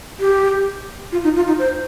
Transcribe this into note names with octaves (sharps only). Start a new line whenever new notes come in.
G4
F4
D#4
F4
D#4
C5